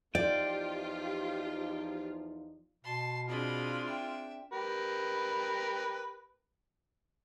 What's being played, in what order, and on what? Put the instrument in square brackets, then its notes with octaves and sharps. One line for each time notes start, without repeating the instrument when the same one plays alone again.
[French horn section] E2 F3 D#4 [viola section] F4 G4 [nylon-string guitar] D5 [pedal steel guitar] G5
[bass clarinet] B2 [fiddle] A5 C6
[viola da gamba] C4 D4 G#4 [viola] F4 [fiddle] D#5 B5
[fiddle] E5 G5
[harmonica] G4 A#4 B4